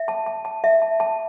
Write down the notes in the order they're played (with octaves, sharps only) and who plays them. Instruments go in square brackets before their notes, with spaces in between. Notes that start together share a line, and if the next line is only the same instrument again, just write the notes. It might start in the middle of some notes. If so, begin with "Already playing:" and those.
Already playing: [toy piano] E5
A5
A5
A5
E5
A5
A5